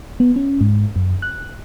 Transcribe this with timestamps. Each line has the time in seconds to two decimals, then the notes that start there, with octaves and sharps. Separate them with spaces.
0.20 B3
0.36 C#4
0.61 G#2
0.96 F#2
1.22 F#6